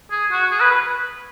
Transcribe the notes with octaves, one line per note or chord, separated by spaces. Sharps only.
G#4
F#4
G#4
B4
B4